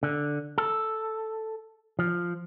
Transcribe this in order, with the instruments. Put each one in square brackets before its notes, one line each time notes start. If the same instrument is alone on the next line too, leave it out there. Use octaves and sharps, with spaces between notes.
[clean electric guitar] D3
A4
F3